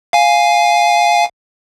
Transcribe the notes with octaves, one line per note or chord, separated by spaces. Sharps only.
F5 G#5